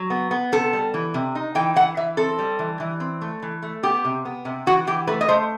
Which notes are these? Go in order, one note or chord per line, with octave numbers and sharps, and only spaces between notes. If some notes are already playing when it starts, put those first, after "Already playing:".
Already playing: F#3
B3
B3
C3 A4
G3
E3
C3
D#4
E3 G5
E3 F#5
E3 E5
C4 A4
G3
E3
E3
C4
A3
E3
A3
B3 G4
C3
B3
C3
E3 F#4
E3 G4
A3 B4
D#5
A3 C5